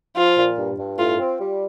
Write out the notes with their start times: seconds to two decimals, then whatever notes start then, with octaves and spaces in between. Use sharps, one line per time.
0.16 F3 F4
0.37 A#2
0.58 G2
0.78 G2
0.98 A2 F4
1.19 C4
1.40 G3